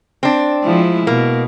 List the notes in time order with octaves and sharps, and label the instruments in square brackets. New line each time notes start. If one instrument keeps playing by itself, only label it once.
[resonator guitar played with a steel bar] C4 D4
[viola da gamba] F3 G#3 E4
[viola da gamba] B2 [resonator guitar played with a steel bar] A#3